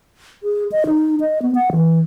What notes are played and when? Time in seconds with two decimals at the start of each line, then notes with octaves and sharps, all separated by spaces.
0.43 G#4
0.72 D#5
0.87 D#4
1.21 D#5
1.42 B3
1.55 F#5
1.73 E3